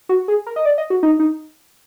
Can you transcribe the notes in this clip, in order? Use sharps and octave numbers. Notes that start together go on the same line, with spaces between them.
F#4
G#4
A#4
D#5
D5
D#5
F#4
D#4
D#4